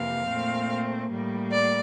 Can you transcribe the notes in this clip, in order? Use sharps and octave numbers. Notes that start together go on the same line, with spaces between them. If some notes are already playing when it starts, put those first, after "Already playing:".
Already playing: F2 C3 E3 A#3 F5
A#2 A3 C4
A2 G3 A#3
D5